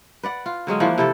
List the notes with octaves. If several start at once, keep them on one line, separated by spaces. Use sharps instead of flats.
B4 D5 F#5
F4
D3 F#3 G#3 C#4
E3 F3 A#3 D4
C3 E4 A4